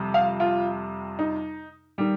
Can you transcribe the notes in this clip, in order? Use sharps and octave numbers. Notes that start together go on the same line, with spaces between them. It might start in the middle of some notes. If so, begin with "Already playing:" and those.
Already playing: F2 C3 G3
F5
F4
D#4
D#3 G3